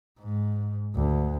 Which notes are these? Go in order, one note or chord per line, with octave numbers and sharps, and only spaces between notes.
G#2
D2